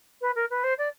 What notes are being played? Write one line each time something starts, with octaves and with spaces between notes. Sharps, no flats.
B4
A#4
B4
C5
D5